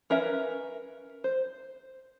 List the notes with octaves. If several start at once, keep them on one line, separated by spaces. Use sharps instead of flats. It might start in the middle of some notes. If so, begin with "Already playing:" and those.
C#4 A#4 B4 E5
C5